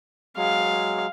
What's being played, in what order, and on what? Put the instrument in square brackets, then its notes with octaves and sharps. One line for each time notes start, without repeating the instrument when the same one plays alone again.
[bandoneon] F#3 G#3 [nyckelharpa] F5